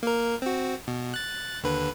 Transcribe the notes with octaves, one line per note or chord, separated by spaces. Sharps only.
A#3 A#4
C4 F#4
B2
F#6 A6
D#2 D3 B4